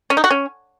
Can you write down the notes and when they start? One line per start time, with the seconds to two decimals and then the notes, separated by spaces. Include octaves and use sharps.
0.10 C#4
0.17 D#4
0.24 F#4
0.31 C#4